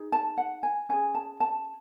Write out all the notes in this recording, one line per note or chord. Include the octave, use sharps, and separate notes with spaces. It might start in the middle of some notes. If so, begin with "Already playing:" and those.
Already playing: D#4 G#4
A5
F#5
G#5
C#4 G#4 G#5
A5
A5